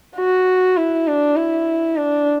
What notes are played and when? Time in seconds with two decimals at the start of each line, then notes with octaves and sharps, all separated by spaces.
0.17 F#4
0.77 E4
1.07 D4
1.36 E4
1.97 D4